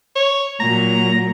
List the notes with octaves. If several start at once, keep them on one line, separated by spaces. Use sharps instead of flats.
C#5
A#2 F#3 A#5